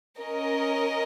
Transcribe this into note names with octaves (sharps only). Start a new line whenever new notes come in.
C#4 A#4 D#5